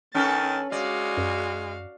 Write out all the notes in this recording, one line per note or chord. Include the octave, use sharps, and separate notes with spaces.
D#3 C#4 A4 B4 A6
G#3 F#4 D5 F5
F#2